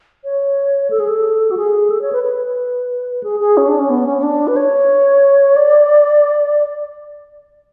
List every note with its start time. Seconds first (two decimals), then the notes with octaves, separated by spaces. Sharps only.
0.24 C#5
0.90 A4
1.00 G#4
1.08 A4
1.51 F#4
1.57 G#4
1.90 A4
2.02 C#5
2.13 B4
2.23 B4
3.23 G#4
3.40 G#4
3.57 C#4
3.68 D4
3.79 C#4
3.90 B3
4.06 C#4
4.18 C#4
4.23 D4
4.47 B4
4.56 C#5
5.56 D5